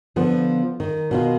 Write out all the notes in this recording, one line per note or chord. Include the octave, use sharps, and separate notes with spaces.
D3 F3 B3
D#3
B2 D#3 F4